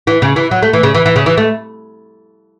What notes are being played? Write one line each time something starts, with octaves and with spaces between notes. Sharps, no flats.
E3
C#3
E3
F#3
A3
E3
C#3
E3
E3
C#3
E3
A3